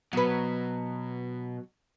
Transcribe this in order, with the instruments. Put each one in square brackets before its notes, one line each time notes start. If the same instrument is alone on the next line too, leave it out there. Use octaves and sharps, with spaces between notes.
[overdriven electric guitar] B2 [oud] F#3 B4